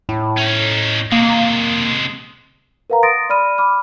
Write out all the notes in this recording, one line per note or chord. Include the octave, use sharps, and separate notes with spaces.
A2
C#4 D#4
C3 G#3 A#3
A#4 B4 F5 F#5 A#5
C6 D#6 A6 A#6 D7
D5 B5 F6 D#7
B5 D6 F6